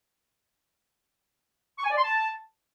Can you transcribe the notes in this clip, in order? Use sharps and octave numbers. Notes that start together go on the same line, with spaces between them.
C#6
G#5
D5
C6
A5